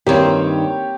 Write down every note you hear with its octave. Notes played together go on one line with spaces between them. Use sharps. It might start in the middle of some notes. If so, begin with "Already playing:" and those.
G2 D#3 A#3 C4 G4 C#5